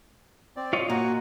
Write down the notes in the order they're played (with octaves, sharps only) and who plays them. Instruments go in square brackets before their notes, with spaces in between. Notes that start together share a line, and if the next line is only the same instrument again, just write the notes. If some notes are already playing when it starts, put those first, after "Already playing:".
[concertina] C4 D5
[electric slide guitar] F4 C#5 D#5
[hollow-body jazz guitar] A#2 [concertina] F#4 A#5